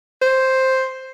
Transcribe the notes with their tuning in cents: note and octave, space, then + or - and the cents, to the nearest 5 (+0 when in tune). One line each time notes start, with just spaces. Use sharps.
C5 +5